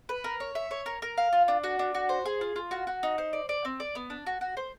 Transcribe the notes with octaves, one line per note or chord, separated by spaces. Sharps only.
B4
A#4
C#5
E5
C#5
A#4
A#4
F5
F4
D4
F#4
D4
F#4
C5
G#4
F4
F4
F#4
F#4
D#4
C5
D5
D5
C4
D5
B3
D4
F#4
F#4
C5